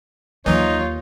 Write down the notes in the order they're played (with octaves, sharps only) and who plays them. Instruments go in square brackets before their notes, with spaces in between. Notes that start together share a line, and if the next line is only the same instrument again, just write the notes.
[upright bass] D#2 [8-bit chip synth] E3 F#3 [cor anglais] D#4 [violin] F4 C#5